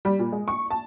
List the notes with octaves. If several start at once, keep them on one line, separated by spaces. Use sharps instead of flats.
G3
A#2
G#3
C#6
A5